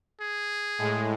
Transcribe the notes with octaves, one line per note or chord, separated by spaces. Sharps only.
G#4
A2 G#3